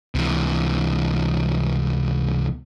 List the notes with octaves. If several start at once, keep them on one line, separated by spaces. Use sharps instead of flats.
C#2 C3 E3